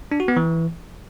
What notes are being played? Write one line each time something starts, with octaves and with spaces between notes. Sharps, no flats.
D4
F#4
B3
E3